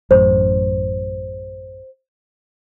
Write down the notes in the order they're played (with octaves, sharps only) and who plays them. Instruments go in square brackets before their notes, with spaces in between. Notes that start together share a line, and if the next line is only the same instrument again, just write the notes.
[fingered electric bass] A1 F#2 A2 [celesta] C5